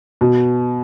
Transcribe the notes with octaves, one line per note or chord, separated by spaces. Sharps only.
B2